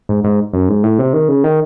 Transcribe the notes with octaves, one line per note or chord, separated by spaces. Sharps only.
G#2
G#2
F#2
G#2
A2
C3
D#3
C#3
D#3